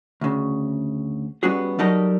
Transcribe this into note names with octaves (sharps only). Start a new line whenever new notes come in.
D2 C#3
G3 B3 C#4 F#4 G#4
F#3 G3 D#4 A4 A#4 D#5